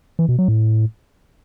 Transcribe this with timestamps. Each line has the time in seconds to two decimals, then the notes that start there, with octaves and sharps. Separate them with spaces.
0.19 E3
0.29 B2
0.39 F#3
0.48 A2